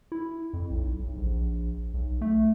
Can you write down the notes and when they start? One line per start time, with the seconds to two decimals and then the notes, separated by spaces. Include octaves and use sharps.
0.12 E4
0.53 F2
0.70 B1
1.00 B1
1.17 A#1
1.94 B1
2.21 A3